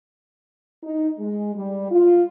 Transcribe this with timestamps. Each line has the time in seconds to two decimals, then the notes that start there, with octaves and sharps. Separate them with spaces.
0.83 D#4
1.17 G#3
1.54 G3
1.90 F4